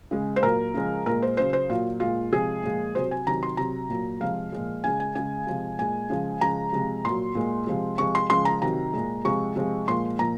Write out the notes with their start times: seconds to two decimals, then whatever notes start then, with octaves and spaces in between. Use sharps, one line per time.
0.11 C#3 G#3
0.36 C5
0.43 A#2 F#3 A#4
0.74 C#3 F3 G#3
1.06 A#2 G#3 A#4
1.22 C5
1.37 C#3 F#3 C5
1.53 C5
1.70 A#2 F#3 F4
2.00 A#2 G#3 F4
2.32 C3 F3 G#3 G#4
2.64 A#2 F3 G#3
2.95 C3 F#3 C5
3.11 G#5
3.27 C3 D#3 F#3 A#5
3.43 C6
3.57 C3 F#3 A#5
3.90 A#2 F#3
4.20 C3 F3 G#3 F5
4.52 A#2 F3 G#3
4.84 C#3 G#3 G#5
5.00 G#5
5.15 C#3 G#3 G#5
5.47 C3 F3 G#3
5.79 A#2 G#3 G#5
6.10 C#3 F3 G#3
6.41 C#3 F3 G#3 A#5
6.73 C3 F3 G#3
7.05 A#2 F#3 C6
7.35 A#2 G#3
7.67 C3 F3 G#3
7.98 C3 F3 G#3 C#6
8.15 C6
8.30 C#3 F3 G#3 C6
8.45 A#5
8.62 C3 D#3 F#3 A#5
8.93 A#2 G#3
9.25 C3 F3 G#3 C#6
9.56 C3 F3 G#3
9.88 A#2 F3 G#3 C6
10.19 A#2 F3 A#5